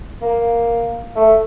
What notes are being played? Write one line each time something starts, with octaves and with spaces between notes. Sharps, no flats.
A#3
A3